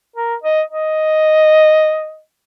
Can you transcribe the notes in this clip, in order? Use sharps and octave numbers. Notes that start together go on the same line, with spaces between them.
A#4
D#5
D#5